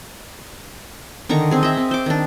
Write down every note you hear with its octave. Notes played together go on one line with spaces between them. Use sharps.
D3 D#3 A#5 C#6
C4 G#4
D#5 E5
C4
C5 D6
D#3 D4